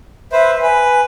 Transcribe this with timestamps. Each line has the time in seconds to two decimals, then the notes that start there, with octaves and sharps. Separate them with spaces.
0.32 B4 C5 E5
0.62 B4 G#5